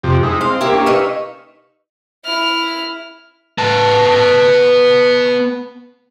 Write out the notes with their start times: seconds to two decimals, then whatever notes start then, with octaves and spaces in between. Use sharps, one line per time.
0.04 F2 C3 G4
0.23 G#3 D#4 E4
0.41 C4 F5
0.61 A#3 E4 G4
0.73 A#3 C#4 D4
0.86 D#4 B4 F5 C#6 E6
2.25 E4 F6
3.58 B3 A5